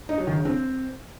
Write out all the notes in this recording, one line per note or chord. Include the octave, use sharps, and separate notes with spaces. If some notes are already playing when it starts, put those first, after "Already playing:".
D#4
F#3
D#3
C#3
C4